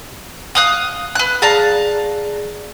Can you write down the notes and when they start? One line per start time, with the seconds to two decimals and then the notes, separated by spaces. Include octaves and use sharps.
0.55 F5 D#6 F#6
1.15 B4 F#6
1.42 G#4 D5 F5 A5 A#5